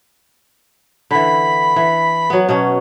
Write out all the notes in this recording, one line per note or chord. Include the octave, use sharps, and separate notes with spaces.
D3 E3 B5
E3
F#3 B3
B2 F#3 C#4